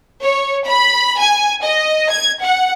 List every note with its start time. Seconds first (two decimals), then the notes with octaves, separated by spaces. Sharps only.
0.22 C#5
0.67 B5
1.18 G#5
1.64 D#5
2.10 G#6
2.42 F#5